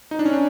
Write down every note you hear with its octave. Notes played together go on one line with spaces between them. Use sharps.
D#4
D4
C#4
D4